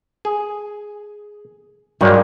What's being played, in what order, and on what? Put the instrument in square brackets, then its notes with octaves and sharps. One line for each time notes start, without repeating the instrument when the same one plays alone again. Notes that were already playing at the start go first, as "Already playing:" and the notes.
[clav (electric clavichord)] G#4
[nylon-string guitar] G2 F#3 [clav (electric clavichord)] D#3 G#3 A#3